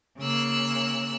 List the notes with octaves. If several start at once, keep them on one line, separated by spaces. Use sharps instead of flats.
C#3 A#3 E6 F#6